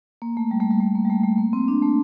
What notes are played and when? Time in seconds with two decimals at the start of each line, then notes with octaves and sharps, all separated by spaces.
0.22 A#3
0.37 A3
0.51 G3
0.60 A3
0.70 G3
0.80 A3
0.95 A#3
1.05 G3
1.10 A3
1.24 A3
1.38 A#3
1.53 C4
1.68 D4
1.82 A3